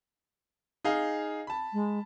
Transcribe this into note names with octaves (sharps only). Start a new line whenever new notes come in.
D#4 G#4 F5
A5 B5
G#3